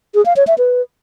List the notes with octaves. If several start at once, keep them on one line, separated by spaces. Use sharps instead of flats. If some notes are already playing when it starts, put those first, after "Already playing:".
G#4
F5
C#5
E5
B4